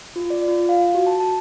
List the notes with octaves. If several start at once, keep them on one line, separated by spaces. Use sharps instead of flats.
F4
D5
F4
F5
F#4
A5
A5